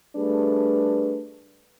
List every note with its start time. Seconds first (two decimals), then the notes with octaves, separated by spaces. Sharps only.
0.16 G3 A3 D4 G#4 B4